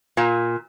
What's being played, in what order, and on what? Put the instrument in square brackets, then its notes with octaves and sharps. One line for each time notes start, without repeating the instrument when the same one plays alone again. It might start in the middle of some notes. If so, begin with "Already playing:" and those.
[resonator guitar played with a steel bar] A#2